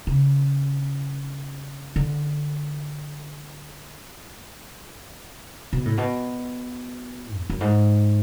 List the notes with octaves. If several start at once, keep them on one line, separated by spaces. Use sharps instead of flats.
C#3
D3
B2
A2
B2
E2
F#2
G#2